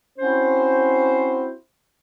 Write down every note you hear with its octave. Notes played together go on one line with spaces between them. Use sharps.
C4 C#4 E4 F#4 C5